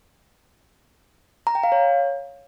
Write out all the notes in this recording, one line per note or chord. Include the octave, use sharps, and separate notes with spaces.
A#5
G5
F5
C#5